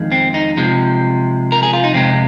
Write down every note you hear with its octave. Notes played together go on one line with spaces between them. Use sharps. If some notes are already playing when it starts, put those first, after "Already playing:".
Already playing: F2 D#3 G#3
C4
D#4
C3 F3 G#3
A#4
G#4
F4
D#4
F2 C3 G#3 C4